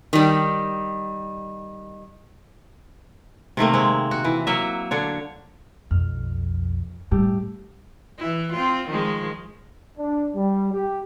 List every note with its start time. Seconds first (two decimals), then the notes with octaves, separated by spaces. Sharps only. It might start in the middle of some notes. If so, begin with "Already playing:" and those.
0.13 D#3 G3
3.57 C3 D#3 A3 A#3
3.73 G#3 C4
4.11 F#4
4.24 E3
4.47 F#3 A#3 E5
4.91 D3 D4 C#5
5.91 B1 F2 F6
7.11 D#2 A2 G3 A3 G4
8.18 E3 E4
8.53 C4 F4
8.89 D#3 F3 G#3
9.98 D4
10.36 G3
10.73 G4